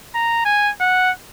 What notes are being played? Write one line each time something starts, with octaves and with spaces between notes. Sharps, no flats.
A#5
G#5
F#5